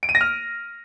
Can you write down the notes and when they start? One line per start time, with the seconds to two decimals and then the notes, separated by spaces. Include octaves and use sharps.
0.03 D7
0.09 D#7
0.15 A#6
0.21 F6